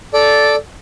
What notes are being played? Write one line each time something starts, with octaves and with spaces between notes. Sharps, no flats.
A4 D5